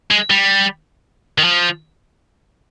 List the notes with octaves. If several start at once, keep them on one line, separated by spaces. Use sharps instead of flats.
G#3
G3
D#3
F3